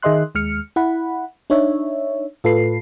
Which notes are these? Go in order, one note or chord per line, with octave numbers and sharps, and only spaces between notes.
D#3 G#4 D#5 E5 C6 F#6
D#2 G#3 F6 C#7
E4 F#5 B5
D4 D#4 C#5 E5
A2 F4 A4 B4 C7